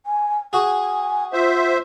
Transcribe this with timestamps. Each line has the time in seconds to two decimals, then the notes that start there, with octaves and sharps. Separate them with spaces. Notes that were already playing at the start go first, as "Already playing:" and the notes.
0.06 G#5
0.53 F#4 G#4 G#5
1.33 F4 C5 E5